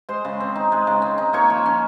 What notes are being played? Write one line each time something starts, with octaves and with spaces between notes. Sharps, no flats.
G#3 C5 C6
C#3
C4
D#4
G#3
C#3
C4
D#4
A#3 C#5 C#6
F3
C#4